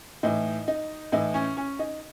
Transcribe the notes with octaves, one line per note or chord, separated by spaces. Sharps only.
A2 E3 D#4
D#4
A2 E3 D#4
C#4
C#4
D#4